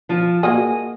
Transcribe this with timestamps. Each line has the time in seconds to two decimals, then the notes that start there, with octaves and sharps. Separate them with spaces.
0.09 F3 F4
0.43 A#3 F#4 G#4 D#5